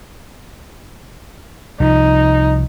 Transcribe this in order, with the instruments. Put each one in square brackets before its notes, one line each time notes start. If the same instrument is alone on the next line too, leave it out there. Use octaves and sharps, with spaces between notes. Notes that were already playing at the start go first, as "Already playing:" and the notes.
[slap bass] C2 F3 [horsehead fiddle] D#4